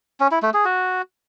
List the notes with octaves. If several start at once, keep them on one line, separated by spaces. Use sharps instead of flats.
C#4
E4
A3
G#4
F#4